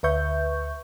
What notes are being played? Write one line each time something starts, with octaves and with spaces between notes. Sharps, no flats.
D2 B4 E5 C#6 G6